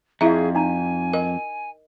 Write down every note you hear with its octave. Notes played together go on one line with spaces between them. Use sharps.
F2 E4 G#4 E5 F5 A#5
D4 D#4 G#5 A#5
A#4 D#5